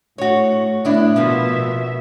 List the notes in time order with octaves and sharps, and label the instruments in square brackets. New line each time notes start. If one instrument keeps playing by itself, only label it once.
[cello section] A2 [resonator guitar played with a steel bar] F#4 C#5
[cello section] A2 [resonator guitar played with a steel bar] B3 D4 E4
[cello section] B2 E5 [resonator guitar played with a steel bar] F3 A#3 B3